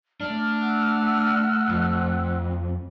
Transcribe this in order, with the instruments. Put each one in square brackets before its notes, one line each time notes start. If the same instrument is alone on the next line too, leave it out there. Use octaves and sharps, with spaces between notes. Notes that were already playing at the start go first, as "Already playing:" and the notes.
[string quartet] A3 [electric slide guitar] D4 [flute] F6
[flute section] F#5 E6 F#6
[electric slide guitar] F2